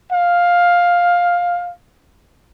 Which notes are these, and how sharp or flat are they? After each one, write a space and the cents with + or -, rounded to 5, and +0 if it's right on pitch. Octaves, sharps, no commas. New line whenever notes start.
F5 +10